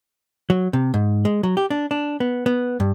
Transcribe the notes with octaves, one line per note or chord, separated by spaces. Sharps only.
F#3
C3
G#2
G#3
F#3
G4
D4
D4
B3
B3
G2